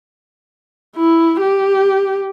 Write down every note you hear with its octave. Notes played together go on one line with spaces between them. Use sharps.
E4
G4